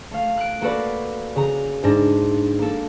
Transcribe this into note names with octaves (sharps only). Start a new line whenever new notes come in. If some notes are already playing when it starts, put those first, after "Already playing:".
A3 F5
F#6 D7
A#3 F#4 A4 B4 D5
C#3 A#5
G#2 D4 A#6
A#3 A4